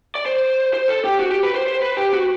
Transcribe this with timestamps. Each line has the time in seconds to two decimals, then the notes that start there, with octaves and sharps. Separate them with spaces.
0.15 D5
0.26 C5
0.74 C5
0.88 A4
1.05 G4
1.20 F#4
1.31 G4
1.43 B4
1.55 C5
1.67 C5
1.82 B4
1.97 G4
2.13 F#4